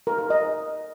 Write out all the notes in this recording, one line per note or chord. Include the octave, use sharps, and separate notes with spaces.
A#4
A#4
D#5